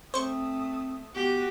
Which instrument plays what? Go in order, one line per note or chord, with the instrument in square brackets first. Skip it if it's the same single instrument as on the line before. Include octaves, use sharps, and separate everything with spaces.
[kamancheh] A3 D#6 [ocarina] C4 [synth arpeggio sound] C5 C#6
[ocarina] B3 [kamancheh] F#4 [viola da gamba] G4